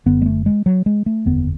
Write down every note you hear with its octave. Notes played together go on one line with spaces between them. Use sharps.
F#1 F#2 D3 B3
G#3
A3
G#3
F#3
G#3
A3
F#1 E2 D3 B3